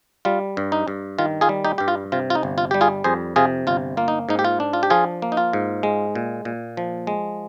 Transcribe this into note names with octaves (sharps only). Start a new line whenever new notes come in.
G3 F4
G2
D#4
G2
D#3 F4
F4 G#4
G3
D#4 G4
G2 G4
F4
C3 F4
F4
D#4
G1
F4
G3 G4
F4 G#4
F2 G#4 C5
C3 F4 G#4
G1 F4
A#3 F4
D#4
G#2 D#4
G4
F4
D4
F4
G4
F3 F4 G#4
A#3
D#4
F4
G#2
G#3
A#2
A#2
F3
G#3